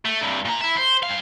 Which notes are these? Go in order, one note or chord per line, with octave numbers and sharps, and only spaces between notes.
A3
G2 C3
A#2 A#5
E4 E5
C5
G2 F5